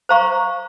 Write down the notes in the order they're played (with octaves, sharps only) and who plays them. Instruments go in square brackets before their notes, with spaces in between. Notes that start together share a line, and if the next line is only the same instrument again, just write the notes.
[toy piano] C5 F5 A#5 C#6